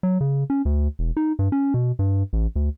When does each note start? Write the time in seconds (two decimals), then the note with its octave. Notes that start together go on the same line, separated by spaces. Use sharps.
0.03 F#3
0.21 C#3
0.50 C#4
0.65 D2
0.99 E1
1.17 D#4
1.39 G2
1.52 C#4
1.74 B2
1.99 G2
2.33 A1
2.55 D2